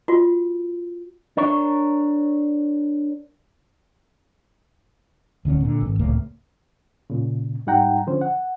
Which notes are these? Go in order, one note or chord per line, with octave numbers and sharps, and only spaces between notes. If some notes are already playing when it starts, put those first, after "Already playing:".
F4 F#4
D4 A#4 C#5
D1 D3 C4 C#4
A#2 D3
G#1
D#1 C#2 A2 A#3
A#2 C#3
G#2 G3 D#4 F#5 G5 A#5
D3 F3 C#4 C5
F#5